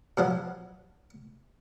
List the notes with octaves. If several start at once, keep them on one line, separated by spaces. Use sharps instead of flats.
B2 F3 F#3